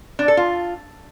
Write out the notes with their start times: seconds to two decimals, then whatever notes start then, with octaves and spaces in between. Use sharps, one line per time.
0.19 D4
0.28 A4
0.37 F4